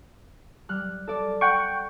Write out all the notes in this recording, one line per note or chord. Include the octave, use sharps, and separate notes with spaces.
G3 F6 F#6
A4 D5
F#5 G5 C#6 D7